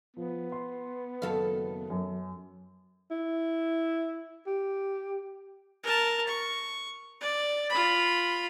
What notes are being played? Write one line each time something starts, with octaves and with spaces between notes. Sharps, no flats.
F3 B3
C6
F#1 D#3 F#4 A4 F5
F#2
E4
G4
A#4 A5
C#6
D5
F4 B5